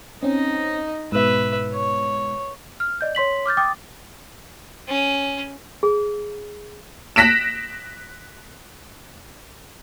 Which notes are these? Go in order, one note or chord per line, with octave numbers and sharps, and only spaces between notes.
C4 C#4 D#4 D#5
G#2 B2 B4 E5
C#5
F6
D5 D#5 G6
C#5 C6 B6 F#7
D6 F6 G6 A6
G5 D6 D#6 A6
C#4
G#4
F#6 A#6 B6 D7 E7